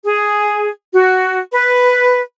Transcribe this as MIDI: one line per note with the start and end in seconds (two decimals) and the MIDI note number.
0.04 0.69 68
0.92 1.38 66
1.51 2.20 71